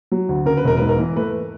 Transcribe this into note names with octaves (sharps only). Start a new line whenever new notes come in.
F#3
D2
C#3 A#4
B4
E1 A#4
G#2 B4
A#4
E3
A3 B4